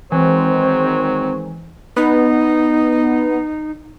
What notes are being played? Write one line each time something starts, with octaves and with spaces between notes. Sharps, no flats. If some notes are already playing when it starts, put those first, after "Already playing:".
D#3 E3 F#3 G#3 C4 C5
B3 D#4